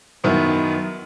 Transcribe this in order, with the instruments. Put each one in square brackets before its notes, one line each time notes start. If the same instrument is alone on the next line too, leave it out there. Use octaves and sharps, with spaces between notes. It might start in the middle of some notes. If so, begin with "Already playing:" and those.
[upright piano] F#2 D#3 B3 E4